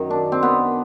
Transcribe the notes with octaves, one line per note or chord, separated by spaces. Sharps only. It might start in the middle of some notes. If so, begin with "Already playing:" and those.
Already playing: F#2 D#3 F#3
D4
C4
B3